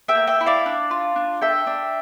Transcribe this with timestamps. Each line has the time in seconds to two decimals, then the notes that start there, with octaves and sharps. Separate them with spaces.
0.08 E5 G5
0.15 A#3
0.27 E5 G5
0.41 E4
0.46 D5 F5
0.66 D4
0.91 F4
1.16 D4
1.41 A4 E5 G5
1.67 D4